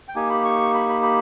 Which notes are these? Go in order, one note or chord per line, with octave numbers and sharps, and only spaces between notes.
G5
A#3 D#4 G4 G#5
B5
C#6
B5
B5
B5